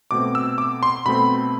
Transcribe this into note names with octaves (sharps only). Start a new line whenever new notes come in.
B2 A3 C4 D6
E6
D6
C6
B2 A3 C4 B5